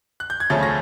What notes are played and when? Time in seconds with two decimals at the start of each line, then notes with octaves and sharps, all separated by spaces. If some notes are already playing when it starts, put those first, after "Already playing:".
0.20 F#6
0.30 G6
0.40 G#6
0.50 D2 C#3 F3 A3 C#4 A6
0.63 A#6